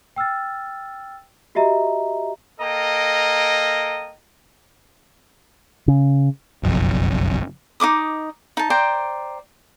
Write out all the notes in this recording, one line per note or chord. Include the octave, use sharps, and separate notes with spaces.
G5 E6 F6 A6
F#4 G4 D#5 E5 A#5
A#3 A4 D#5 G5 A#5
C#3
F#1 B1 F2
D#4 B4 D6 D#6
D#4 A5
C5 D5 G5 A#5